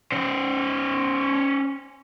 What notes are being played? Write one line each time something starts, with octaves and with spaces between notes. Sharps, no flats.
C#4 C5